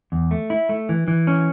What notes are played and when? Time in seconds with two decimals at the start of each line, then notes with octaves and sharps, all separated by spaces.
0.12 E2
0.31 A3
0.50 E4
0.69 A3
0.89 E3
1.08 E3
1.27 C#4